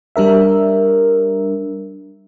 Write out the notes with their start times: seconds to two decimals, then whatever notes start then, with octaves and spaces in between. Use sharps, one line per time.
0.16 G3 D4 A#4 E5